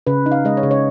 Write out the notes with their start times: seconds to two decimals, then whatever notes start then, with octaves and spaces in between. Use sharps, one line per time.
0.07 C#3 B4
0.26 D#4
0.32 F5
0.45 G#3 D#5
0.57 C#5
0.63 C#3
0.71 C#5